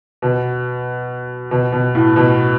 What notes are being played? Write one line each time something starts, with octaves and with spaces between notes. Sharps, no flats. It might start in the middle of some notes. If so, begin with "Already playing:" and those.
B2
B2
B2
A2
B2